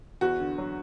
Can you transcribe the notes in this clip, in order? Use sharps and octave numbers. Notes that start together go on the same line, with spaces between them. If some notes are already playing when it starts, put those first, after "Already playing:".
E2 F#4
D3
F#3